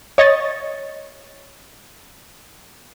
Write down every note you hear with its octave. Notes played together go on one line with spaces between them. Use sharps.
C#5 D#5 C#6 A6